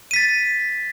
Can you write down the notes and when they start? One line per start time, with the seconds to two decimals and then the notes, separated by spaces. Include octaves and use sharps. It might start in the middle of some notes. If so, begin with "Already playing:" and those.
0.11 D#7
0.14 B6
0.16 A6